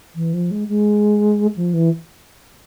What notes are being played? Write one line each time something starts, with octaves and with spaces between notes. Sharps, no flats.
E3
F3
G#3
G#3
F3
E3